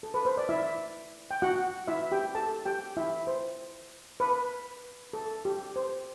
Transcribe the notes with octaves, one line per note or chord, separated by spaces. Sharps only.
A4
B4
C5
D5
E4 E5
G5
F#4 F#5
E4 E5
G4 G5
A4 A5
G4 G5
E4 E5
C5
B4
A4
G4
C5